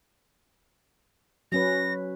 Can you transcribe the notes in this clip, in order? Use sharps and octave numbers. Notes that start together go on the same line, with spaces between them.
F#3 C#4 B4 A#6